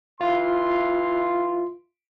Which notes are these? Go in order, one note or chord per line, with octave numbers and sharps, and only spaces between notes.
E3 F4 F5 C6